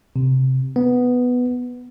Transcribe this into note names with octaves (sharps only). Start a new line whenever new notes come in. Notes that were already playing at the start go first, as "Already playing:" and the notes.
C3
B3